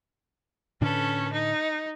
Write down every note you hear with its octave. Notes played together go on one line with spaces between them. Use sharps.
A2 D3 C#4 D4 A4 B4
D#4